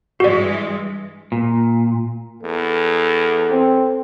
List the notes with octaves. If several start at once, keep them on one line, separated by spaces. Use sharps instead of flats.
G2 E3 G#3 F#4 D5
A#2
E2 A4
C4